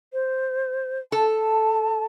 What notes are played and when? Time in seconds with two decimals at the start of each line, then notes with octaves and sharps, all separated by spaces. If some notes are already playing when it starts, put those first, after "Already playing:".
0.13 C5
1.12 A4 A5